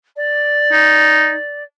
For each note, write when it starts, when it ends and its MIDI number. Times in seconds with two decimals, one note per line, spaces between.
0.16 1.63 74
0.72 1.35 63